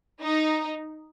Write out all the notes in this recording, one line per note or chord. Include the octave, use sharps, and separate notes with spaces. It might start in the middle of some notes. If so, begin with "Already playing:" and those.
D#4